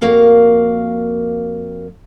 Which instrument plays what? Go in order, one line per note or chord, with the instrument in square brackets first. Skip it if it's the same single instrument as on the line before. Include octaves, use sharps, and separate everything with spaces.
[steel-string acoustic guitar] F2 A#3 F#4 A#4 F5 G5